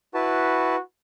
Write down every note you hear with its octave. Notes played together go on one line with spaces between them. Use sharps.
E4 F#4 B4 A5